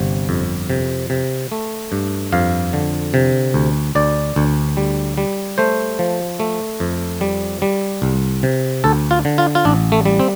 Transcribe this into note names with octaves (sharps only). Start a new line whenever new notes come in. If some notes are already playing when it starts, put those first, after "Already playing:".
Already playing: G1 C3
F2
C3
C3
A3
G2
F2 F5
D3
C3
D2
D2 D5
D2
G3
G3
A3 C5
F3
A3
F2
G3
G3
C2
C3
D2 A4
F4
D3
F4
F4
A1 D4
A3
G3
C4